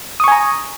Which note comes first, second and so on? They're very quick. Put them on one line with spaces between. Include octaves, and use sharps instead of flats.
D#6 C#6 G#5 A#5